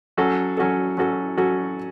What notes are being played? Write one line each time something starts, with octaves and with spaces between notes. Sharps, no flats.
F#3 C#4 F#4 A4
F#3 C#4 F#4 A4
F#3 C#4 F#4 A4
F#3 C#4 F#4 A4